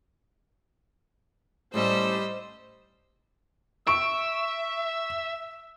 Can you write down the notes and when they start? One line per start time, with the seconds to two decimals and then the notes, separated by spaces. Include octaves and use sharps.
1.74 A2 G3 A3 C#4 C5 D#5 E6
3.87 E5 C#6 E6 D7